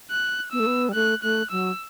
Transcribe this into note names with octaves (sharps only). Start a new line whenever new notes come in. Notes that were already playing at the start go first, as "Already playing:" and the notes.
F#6
B3 E6
A3
B3
G3
A3 F#6
A3 F#6
F#3 E6